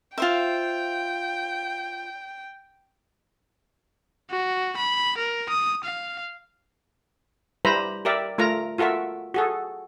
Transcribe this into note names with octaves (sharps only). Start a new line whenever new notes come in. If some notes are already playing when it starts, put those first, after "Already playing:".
F4 C5 E5 G5
F#4
B5
A#4
D#6
F5
G3 E4 B4 C5 A#5 B5
G4 A#4 D5 E5
A3 F4 A#4 A#5
F4 F#4 A4 A#4 E5
F#4 G#4 A4